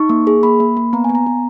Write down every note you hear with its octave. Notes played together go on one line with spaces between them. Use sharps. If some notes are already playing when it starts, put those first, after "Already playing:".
Already playing: D#4 C#6
A#3
G#4
A#3 B5
A#3
A#3
B3 A#5
B3 G#5
A#5
B3